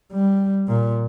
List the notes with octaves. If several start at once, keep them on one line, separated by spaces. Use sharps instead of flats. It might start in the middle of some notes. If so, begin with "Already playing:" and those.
G3
A#2